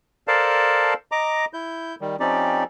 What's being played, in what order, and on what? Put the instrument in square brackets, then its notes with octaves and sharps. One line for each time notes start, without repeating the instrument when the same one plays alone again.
[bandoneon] A4 A#4 C5 D5 F5 A5
D#5 A#5 D6
E4 G6
D#3 G3
F3 C4 C#4 D#4 G4 D5